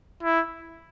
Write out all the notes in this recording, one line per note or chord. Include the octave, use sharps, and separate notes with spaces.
E4